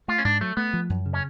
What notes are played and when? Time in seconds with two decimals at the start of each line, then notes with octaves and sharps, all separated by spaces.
0.08 A3 F4
0.18 C#4
0.25 G#2 D4
0.41 F#3 A3
0.57 A3 B3
0.74 F3
0.90 F#2
1.06 C#3
1.13 C#4